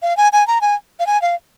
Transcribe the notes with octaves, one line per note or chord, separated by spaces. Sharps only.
F5
G#5
G#5
A#5
G#5
F5
G#5
F5